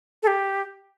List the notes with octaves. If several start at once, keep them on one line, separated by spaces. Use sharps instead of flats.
A4
G4